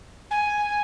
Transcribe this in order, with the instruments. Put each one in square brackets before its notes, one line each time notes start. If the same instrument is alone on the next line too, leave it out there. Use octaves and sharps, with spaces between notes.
[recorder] G#5